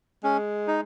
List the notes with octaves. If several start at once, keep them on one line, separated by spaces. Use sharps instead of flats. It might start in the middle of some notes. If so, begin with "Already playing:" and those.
G#3 C#4
D#4